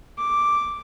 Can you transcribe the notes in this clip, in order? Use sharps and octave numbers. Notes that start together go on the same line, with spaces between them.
D6